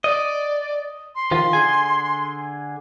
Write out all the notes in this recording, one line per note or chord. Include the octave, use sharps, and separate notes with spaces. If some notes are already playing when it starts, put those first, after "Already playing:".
D5 D#5
C6
D#3 F3 F4
D3 G#4 G#5